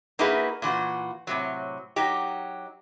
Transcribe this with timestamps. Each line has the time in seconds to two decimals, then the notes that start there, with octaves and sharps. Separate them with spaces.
0.19 A#3 D#4 E4 F#4 G#4 B4
0.62 A#2 E3 F4 F#4
1.27 A2 C3 F#3
1.96 F#3 D#4 G4